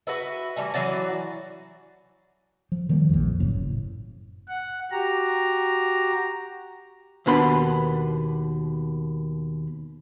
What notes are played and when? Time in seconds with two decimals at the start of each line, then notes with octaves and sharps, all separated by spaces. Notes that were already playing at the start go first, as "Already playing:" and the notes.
0.07 F#4 B4 E5
0.56 E3 G3 A3 G#5
0.74 E3 F#3 F#4 D5
2.72 F3
2.89 D#3 F3 G3 A#3
3.10 A#1 F2
3.40 F#1 A2 C#3
4.48 F#5
4.91 F#4 G4 A#5
7.26 D#2 B2 D4 B4 B5 C6